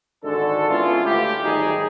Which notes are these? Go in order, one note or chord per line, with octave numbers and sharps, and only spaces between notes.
G#1 D3 G#3 D4 F#4 A4
G#3 B3 C#4 E4 F4
D2 G4
G#1 F#3 G3 D#4 G#4